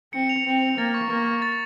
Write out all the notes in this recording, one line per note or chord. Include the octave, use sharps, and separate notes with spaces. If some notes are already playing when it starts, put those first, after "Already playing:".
C4 C#7
F7
C4 F7
F7
A#3 A6
C#6
A#3 C#6
C#6
A6